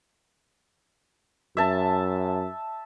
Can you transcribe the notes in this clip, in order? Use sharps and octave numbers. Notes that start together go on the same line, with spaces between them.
F#2 E5 A5